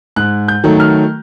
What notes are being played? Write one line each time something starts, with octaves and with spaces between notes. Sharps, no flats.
G#2 F#6
G6
D#3 F#3 A3
F6